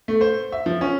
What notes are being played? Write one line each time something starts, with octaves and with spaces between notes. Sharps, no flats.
A3
C5
E5
F3
C#4